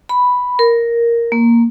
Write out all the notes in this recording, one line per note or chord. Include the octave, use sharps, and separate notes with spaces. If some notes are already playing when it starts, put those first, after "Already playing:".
B5
A#4
A#3